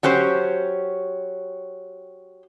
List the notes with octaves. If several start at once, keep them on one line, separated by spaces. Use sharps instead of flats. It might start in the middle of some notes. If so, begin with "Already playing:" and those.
F#3 C#4 G4 C5